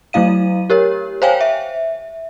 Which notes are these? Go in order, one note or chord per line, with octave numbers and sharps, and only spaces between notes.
F#3 A3 E4 F5 D#7
G4 A#4 C#5
C5 C#5 F5 G5 G#5
E5